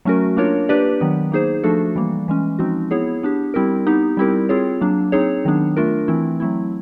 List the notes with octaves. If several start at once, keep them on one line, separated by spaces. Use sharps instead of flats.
F#3 A3 C#4 F#4 A#4
A#3 D4 F4 A#4 C#5
A#3 D4 G4 B4 D5
D#3 F#3 B3
A#3 D#4 G#4 C5
F3 A3 D4 F#4 A4
E3 G3 A#3
E3 G#3 C#4
F3 G#3 C4 D#4 F#4
B3 E4 G#4 C#5
B3 D4 G4
G3 C4 E4 G4 A#4
B3 D#4 G4
G3 C4 E4 G4 A#4
C4 F4 G#4 C#5
F#3 A#3 D4
C4 D#4 G#4 C#5
D#3 F#3 B3 D4
A3 D4 F4 A#4
E3 A3 C4 E4
F#3 A3 C4 E4